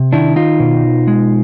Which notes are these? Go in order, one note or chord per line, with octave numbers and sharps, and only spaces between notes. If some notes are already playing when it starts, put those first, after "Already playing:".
Already playing: C3
D#3 D4 E4
D#4 F4
B2
G#3